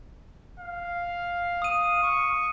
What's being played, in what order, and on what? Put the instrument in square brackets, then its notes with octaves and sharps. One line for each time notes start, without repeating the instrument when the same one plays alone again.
[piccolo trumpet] F5
[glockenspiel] D#6 D#7
[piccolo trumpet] C#6